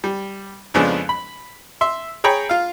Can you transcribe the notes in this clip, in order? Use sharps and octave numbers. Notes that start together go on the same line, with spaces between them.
G3
F2 C#3 F3 G#3 B3 D4
B5
E5 C6
G#4 C#5 G5 A#5 B5
F4 F5